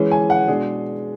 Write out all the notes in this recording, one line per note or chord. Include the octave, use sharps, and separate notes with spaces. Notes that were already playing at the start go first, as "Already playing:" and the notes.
Already playing: E3 G#3 C#4
G#5
F#5
B2 G#3 D4 G#4